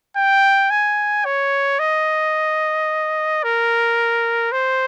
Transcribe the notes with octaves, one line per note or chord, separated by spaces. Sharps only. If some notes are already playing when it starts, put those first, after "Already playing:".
G5
G#5
C#5
D#5
A#4
C5